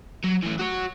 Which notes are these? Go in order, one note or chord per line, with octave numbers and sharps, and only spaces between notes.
F#3
E3 A3
F#4 C#5